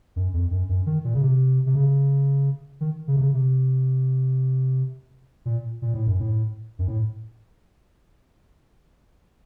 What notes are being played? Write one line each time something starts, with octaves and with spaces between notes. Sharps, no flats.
F#2
F2
F#2
F#2
D#3
A#2
C#3
C3
C3
C#3
D#3
C#3
C3
C#3
C3
A#2
A#2
A2
F#2
A2
F#2
A2